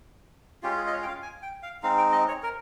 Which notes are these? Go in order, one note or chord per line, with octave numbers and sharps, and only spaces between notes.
G#3 C#4 F4 G4
G#4
D#5
C#5
G5
F5
G#5
G5
F5
G#3 C4 D#4 F5
G5
D#5
C#5
A#4